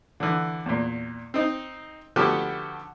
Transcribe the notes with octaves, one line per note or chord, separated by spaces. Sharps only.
D3 E3
E2 A#2
C4 D#4
D3 F3 A3 B3 F#4 G4